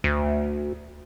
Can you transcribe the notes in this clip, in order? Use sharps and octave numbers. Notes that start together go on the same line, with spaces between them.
D2